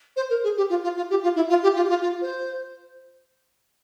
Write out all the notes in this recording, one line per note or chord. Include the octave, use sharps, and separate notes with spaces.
C5
A#4
G#4
G4
F4
F4
F4
G4
F4
E4
F4
G4
F4
G4
F4
F4
C5